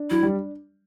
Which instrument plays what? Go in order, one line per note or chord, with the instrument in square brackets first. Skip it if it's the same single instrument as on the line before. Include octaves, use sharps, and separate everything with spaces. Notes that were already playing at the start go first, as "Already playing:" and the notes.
Already playing: [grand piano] D4
[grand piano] F#3 [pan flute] E4
[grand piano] G3